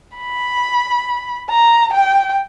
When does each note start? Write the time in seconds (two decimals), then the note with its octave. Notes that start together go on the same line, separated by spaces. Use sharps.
0.17 B5
1.50 A#5
1.94 G5